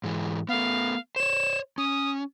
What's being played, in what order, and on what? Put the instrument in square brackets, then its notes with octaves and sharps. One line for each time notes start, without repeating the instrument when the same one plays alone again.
[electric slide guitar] G#2 E3 G#3
[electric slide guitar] A3 B3 [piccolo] F5
[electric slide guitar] C5 C#5 [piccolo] E7
[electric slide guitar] C#4 [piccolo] D#6